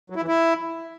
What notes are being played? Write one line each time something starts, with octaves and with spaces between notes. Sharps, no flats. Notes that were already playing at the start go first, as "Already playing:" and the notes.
F#3
E4
E3
E4